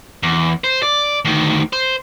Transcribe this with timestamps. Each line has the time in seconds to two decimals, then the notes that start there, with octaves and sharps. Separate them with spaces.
0.23 E2
0.64 C5
0.82 D5
1.25 D2 D#3
1.73 C5